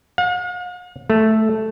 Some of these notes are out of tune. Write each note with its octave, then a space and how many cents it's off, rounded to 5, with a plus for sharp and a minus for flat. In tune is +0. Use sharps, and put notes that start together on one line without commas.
F5 +45
A3 -5